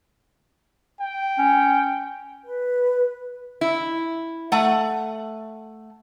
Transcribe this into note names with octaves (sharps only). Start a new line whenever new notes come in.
G5
C#4
B4
E4
A3 F#5